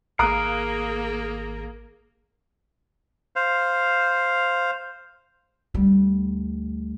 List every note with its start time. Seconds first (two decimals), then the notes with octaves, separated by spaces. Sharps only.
0.19 G#1 A#3 G#4 A#4 F5 A#5 D#6 F#6
3.36 C5 F5
5.74 D2 G3